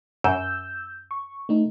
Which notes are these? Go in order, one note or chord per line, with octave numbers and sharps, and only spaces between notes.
F#2 E6 G6
C#6
A3 D#4